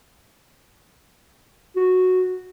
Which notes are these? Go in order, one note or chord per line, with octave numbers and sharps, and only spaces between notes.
F#4